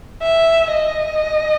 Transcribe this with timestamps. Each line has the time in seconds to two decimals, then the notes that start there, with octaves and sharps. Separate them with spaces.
0.22 E5
0.72 D#5